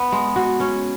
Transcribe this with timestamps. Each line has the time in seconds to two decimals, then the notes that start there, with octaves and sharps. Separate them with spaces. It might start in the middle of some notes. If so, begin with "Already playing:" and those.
Already playing: B3
0.12 G#3
0.36 F#4
0.60 C#4